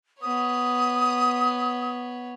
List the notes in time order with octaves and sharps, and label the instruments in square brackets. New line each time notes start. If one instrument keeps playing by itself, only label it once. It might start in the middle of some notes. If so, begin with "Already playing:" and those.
[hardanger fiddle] B3 C#5 [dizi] D#6